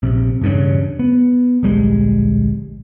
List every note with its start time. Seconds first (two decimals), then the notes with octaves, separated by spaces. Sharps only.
0.03 A#1 C3
0.41 E1 G2 C#3
0.99 B3
1.63 D1 A#1 G3 G#3